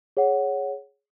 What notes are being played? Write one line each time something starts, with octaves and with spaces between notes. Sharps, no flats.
G#4 C#5 F#5